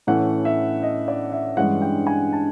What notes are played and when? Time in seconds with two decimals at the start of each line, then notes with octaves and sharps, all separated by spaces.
0.07 A2 E3 A3 C#4 F#5
0.45 E5
0.83 D#5
1.08 D5
1.32 E5
1.57 G2 E3 G#3 C#4 F#5
1.82 G5
2.07 G#5
2.33 A5